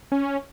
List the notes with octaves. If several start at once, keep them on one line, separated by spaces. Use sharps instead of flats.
C#4